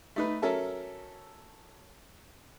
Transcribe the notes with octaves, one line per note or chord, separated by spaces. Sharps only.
A3 D#4 B4
F#3 C#4 A4 A#4 E5 A5